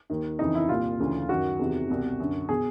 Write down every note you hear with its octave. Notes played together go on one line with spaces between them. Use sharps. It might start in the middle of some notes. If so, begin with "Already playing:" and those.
D#2 D#3
F2 C#3 E3 D#4
E4
C2 A#2 F4
D2 C#3 E3
F#2 D#3 F#4
E2 C3 D#3
C2 B2
F#2 D3
B2 G#4